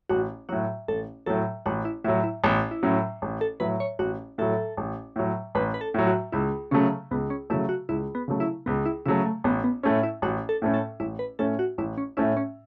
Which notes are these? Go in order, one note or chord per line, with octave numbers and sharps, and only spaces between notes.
A1 F#4
A2 F#3 F#4
A1 A4
A2 F#3 A4
A1 F#4
E4
A2 F#3 E4
E4
A1 B3
E4
A2 F#3 C#4
A1
A4
A2 F#3 B4
C#5
A1 F#4
A2 F#3 A4
A1
A2 F#3
A1 B4
B4
A4
A2 F#3
F#4
C#2 E4
C#3 F#3 A3 C#4
C#2 B3
C#4
C#3 F#3 A3 E4
F#4
C#2 E4
B3
C#3 F#3 A3
E4
C#2 B3
E4
C#3 F#3 A3 E4
A3
A1 B3
B3
A2 A3 C#4
E4
A1 F#4
A4
A2 A3 C#4
A4
A1 E4
B4
A2 A3 C#4 A4
F#4
A1 E4
C#4
A2 A3 C#4 E4
C#4